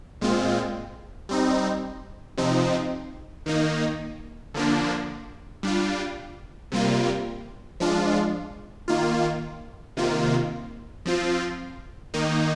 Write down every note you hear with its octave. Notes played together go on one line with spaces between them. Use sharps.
A#2 G#3 C4 F4
G3 C4 D#4
C3 F3 C4 D#4
D#3 A#3 D#4
D3 F3 A#3 D4
G3 D4 F4
C3 G3 A#3 F4
F3 G#3 D4 F4
D#3 A#3 F4
C3 D#3 A#3 F4
F3 C4 F4
D#3 A#3 D#4